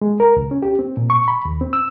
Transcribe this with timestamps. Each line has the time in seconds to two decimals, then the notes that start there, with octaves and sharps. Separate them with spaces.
0.02 G#3
0.20 A#4
0.36 C#2
0.51 C#4
0.62 G4
0.79 C4
0.97 A#2
1.10 C#6
1.28 B5
1.45 D#2
1.61 C4
1.73 E6